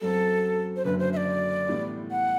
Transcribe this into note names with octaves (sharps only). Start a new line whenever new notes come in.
F#2 F#3 C4 A4
C5
F#1 F#2 D3 B4
C5
E5
D5
A2 E3 G3 B3
F#5